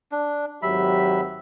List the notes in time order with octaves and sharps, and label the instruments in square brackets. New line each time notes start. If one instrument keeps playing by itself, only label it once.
[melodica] D4
[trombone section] G#1 F#3 G4 [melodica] E5 B5